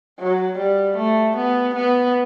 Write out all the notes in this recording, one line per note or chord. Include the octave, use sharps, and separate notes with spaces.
F#3
G3
A3
B3
B3